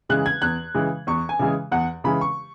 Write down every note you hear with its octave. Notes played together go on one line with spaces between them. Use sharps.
C#3 E3 G#3 F#6
G#6
E2 F#6
C#3 E3 G#3
E2 C#6
G#5
C#3 E3 G#3
E2 F#5
C#3 E3 G#3 B5
C#6